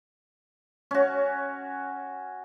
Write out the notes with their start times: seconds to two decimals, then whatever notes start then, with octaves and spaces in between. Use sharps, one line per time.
0.91 C#4 F#4